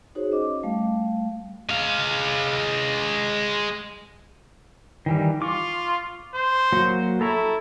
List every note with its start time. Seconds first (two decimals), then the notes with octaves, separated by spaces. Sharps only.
0.15 D#4 F#4 G#4 C5 C#5
0.32 C#4 D#5 D6
0.63 G3 A3 F5
1.69 G#3 F5
5.06 D#3 E3 G3
5.42 F4 C#6 D6
6.35 C5
6.73 F#3 A#3 F#4
7.21 E4 A4 A#5 C#6